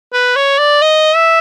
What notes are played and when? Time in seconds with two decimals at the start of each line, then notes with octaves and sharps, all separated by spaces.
0.13 B4
0.36 C#5
0.58 D5
0.82 D#5
1.16 E5